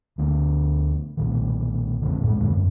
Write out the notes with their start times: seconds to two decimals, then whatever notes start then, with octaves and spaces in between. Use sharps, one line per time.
0.18 D2 D3 B3 D4
1.17 B1 A#2 D#3
2.02 A#1 F2 D3
2.21 A2 F3 G#3
2.36 B1 F2 G#2 D3
2.52 F#2